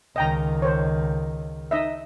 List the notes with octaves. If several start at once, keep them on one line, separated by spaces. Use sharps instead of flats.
C#2 D#3 D#5 G5 A#5
C5 C#5
D#4 D#5 E5